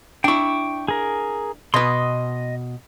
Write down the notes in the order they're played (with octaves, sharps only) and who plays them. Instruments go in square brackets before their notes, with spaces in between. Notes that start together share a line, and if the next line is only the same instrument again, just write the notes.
[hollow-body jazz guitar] D4 E4 [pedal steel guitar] G5 C#6
[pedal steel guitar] G#4 A#4
[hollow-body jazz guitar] B2 B4 [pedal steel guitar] D#5 C6